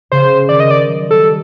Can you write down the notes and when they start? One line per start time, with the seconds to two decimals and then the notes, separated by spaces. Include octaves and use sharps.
0.12 C#3 C5
0.49 D#3 D5
0.60 D#5
0.71 D5
0.87 F#3
1.11 G3 A4